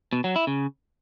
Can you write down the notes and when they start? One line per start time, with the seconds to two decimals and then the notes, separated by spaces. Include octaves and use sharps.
0.13 B2
0.24 F#3
0.36 E4
0.47 C#3